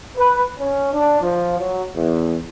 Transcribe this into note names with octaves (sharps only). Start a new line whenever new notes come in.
B4
C#4
D4
F3
F#3
E2